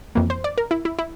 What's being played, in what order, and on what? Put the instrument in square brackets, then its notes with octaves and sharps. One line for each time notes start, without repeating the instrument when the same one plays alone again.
[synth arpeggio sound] F2 E3 A#3
C5
D5
A#4
E4
E4
E4